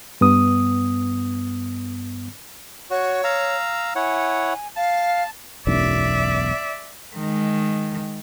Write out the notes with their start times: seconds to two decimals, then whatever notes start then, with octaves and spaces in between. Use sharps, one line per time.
0.21 G2 B3 D#6
2.90 F#4 C#5
3.24 F5 A#5 E6
3.95 E4 C#5 F#5 G#5
4.76 F5 A5
5.67 E1 B1 F#2 D5 E5
7.16 D#3 G#3